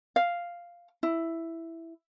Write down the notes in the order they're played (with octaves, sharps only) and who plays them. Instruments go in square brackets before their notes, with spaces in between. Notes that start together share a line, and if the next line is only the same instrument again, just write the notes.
[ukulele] F5
E4